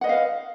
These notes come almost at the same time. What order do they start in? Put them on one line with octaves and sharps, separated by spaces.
F#5 D#5 B4 F5